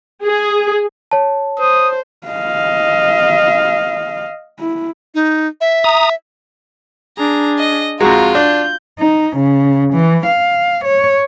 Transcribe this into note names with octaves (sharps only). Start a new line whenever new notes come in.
G#4
C#5 A5
C5 D#6
D#5 F5
E4
D#4
E5
A#5 D#6
D4 G#4 A#5
D#5
F2 G#3 F4 F#4 A#5
D4 G6
D#4
C#3
E3
F5
C#5